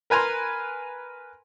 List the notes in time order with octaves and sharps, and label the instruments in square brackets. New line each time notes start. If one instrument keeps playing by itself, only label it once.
[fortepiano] A#4 B4 G#5 A#5 C6